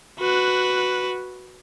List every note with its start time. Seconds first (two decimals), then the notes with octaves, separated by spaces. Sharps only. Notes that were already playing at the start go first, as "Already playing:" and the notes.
0.19 F#4 B4